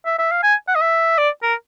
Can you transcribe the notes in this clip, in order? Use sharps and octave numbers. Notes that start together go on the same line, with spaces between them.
E5
E5
F5
G#5
F#5
D#5
E5
D5
A#4